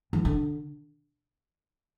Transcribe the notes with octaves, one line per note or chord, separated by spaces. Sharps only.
E3
D3